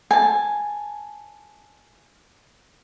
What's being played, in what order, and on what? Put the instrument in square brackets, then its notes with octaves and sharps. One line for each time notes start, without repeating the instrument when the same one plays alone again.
[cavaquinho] G#5 A5